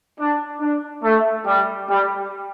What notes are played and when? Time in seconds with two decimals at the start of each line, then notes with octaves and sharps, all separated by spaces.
0.18 D4
0.60 D4
1.03 A3
1.46 G3
1.88 G3